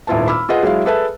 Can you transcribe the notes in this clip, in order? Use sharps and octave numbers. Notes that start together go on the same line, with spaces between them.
D#1 G#1 E4 F4 B4 A5
B5 D6 E6 F6
F4 G#4 B4 D#5 F#5
F#3 G#3 E4 F5
G#4 A4 B4 E5 A5